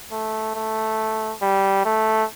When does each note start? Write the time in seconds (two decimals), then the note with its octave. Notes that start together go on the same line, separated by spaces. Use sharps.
0.11 A3
0.55 A3
1.42 G3
1.85 A3